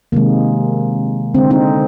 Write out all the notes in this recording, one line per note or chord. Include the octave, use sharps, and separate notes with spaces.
C3 D#3 G#3 A#3
D3 G#3 C4
C4 D#4